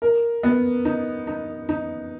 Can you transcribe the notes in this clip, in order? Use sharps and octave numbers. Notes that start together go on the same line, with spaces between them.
A#4
B3
D#4
D#4
D#4